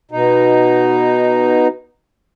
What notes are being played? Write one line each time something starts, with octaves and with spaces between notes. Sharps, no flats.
B2 D#4